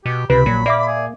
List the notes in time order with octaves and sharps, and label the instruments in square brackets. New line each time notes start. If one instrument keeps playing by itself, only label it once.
[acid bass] B2 [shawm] G4
[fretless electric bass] C#2 [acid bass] C3 [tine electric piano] B4 [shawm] B5
[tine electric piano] A#1 [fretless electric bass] A#2 [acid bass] F#3
[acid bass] A#3 [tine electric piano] D5 E5 D6
[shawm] G#4